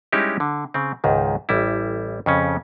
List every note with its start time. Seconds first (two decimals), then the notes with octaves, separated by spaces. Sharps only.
0.13 G3 G#3 C#4 D#4 E4 G4
0.40 D3
0.74 C#3 C4
1.04 C#2 G#2 D#3
1.49 A1 G3 E4
2.26 F2 C#3 C#4